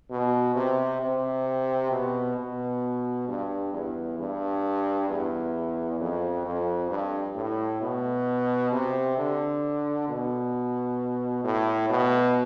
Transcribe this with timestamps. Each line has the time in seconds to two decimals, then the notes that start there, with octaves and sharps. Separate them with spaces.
0.10 B2
0.56 C3
1.01 C3
1.91 B2
2.37 B2
3.28 G2
3.73 E2
4.19 G2
5.09 E2
6.00 F2
6.45 F2
6.90 G2
7.36 A2
7.81 B2
8.72 C3
9.17 D3
10.09 B2
11.44 A2
11.90 B2